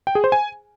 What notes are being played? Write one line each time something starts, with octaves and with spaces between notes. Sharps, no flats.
G5
G#4
C5
G#5